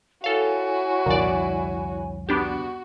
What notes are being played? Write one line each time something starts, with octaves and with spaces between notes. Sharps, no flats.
E4 F#4 A4 C#5 F5 G#5
C2 F2 A#2 D3 D5
B3 D4 F#4 G4